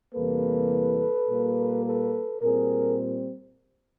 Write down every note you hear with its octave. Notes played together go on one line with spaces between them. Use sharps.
E2 C3 E3 G3 A#3 A4 B4
A#2 G3 A#3
A4 B4
A#2 G3 C4 G#4 A#4